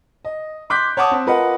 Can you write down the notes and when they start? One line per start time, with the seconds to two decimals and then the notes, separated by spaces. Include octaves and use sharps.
0.25 D#5
0.70 C6 D6 F#6 G6 B6
0.97 C#5 F#5 A5 D6 D#6
1.11 C4
1.26 F4 A#4 B4 D#5 F#5